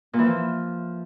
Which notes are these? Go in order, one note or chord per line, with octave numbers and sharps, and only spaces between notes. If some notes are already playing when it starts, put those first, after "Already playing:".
A#2
E3
F3